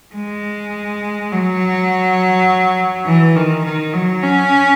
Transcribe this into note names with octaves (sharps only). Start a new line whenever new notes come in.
G#3
F#3
E3
D#3
D#3
F#3
C#4